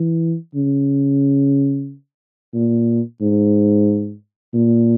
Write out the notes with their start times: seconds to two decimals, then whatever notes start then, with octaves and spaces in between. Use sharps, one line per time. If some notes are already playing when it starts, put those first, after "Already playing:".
Already playing: E3
0.55 C#3
2.54 A#2
3.21 G#2
4.54 A#2